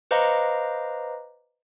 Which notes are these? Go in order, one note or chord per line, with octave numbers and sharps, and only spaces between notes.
B4 C5 D#5 F5 A#5 D6